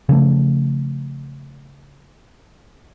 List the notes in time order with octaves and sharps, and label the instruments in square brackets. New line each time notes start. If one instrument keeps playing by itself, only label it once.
[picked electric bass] C#3 F3 A3